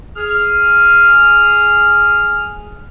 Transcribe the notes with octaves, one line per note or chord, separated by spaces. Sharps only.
G#4 F6